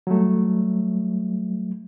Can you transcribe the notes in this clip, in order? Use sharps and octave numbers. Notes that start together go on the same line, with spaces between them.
F#3 G3 A3